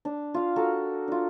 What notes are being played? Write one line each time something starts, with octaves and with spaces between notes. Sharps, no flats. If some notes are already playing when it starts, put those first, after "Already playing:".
D4
F4 F5
F#4 A4 A#4
D4 F4